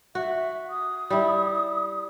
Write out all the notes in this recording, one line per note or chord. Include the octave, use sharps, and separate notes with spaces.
F#4 E5
D#6
G3 E4